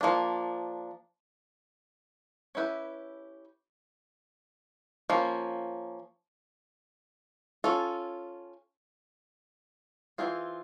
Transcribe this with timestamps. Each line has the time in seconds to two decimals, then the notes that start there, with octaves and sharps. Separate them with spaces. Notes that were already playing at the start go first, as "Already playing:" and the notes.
0.01 F3 A#3 D4
2.55 C#4 E4 G4 B4
5.10 F3 A#3 C#4
7.64 C#4 F4 A4
10.18 E3 G#3 C4 F4 G#4